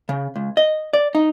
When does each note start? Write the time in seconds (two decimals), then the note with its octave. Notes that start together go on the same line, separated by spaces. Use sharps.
0.09 C#3
0.36 C#2
0.57 D#5
0.93 D5
1.15 D#4